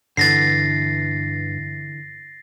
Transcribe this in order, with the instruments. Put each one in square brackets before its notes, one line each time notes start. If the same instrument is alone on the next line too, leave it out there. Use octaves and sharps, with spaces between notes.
[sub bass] G2 [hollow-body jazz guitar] D3 E3 [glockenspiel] A6 A#6 C7